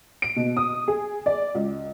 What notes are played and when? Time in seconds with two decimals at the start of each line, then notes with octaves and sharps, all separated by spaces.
0.22 D7
0.36 B2
0.57 D#6
0.88 G#4
1.26 D5
1.55 C#2